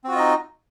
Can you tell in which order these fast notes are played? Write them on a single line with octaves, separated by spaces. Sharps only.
C4 F#4 F4 D#5 D#4